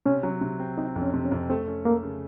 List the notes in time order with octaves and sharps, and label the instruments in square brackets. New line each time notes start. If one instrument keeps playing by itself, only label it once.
[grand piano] C3 [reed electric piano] C#4
[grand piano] F#3
C3
C4
[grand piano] C4 [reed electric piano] D#4
[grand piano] F2
[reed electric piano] C#4
[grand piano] C3
[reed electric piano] C#4
[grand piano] F2
[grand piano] A3 [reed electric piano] C4
[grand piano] C#4
[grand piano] A3 [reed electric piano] A#3
[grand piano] C#3